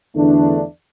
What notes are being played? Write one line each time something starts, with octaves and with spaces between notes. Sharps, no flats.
E2 D3 A3 D4